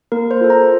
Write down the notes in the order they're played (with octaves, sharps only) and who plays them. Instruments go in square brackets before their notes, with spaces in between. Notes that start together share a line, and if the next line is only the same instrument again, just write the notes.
[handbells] A#3 A#4
C5
F4 A4
A#5